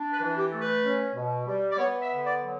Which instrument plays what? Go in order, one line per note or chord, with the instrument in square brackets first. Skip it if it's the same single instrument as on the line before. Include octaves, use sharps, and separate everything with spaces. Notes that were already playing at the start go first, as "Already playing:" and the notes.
Already playing: [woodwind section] D4
B4
E3
G4
A3 A4
B4
C#4
B2
G3
D5
B3 C#5
E5
D3
D5
F#3